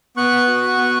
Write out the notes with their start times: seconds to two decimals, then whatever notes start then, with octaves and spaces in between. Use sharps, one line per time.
0.17 B3 C#6 F#6
0.48 F#4
0.78 B3